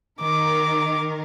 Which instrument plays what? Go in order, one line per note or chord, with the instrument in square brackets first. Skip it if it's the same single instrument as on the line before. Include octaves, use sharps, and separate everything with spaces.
[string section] D#3 A#4 [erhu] D6